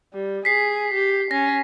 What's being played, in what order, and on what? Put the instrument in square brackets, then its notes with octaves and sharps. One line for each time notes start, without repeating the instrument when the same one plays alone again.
[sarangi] G3
[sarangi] G#4 [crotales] B6 C7
[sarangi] G4
[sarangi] C#4 [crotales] A#6